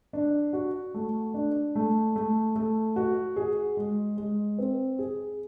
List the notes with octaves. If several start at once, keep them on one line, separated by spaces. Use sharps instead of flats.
D4
F#4
A3
D4
A3
A3
A3
F#4
G#4
G#3
G#3
C4
G#4